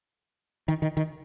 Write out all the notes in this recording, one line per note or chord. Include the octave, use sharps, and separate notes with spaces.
D#3
D#3
D#3